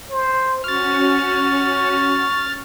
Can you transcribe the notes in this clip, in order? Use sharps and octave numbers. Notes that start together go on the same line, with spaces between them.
C5
C#4 F#4 C#6 F6 A6